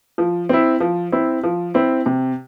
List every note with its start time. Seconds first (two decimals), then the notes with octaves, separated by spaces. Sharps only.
0.18 F3
0.49 C4 E4
0.80 F3
1.12 C4 E4
1.43 F3
1.74 C4 E4
2.06 C3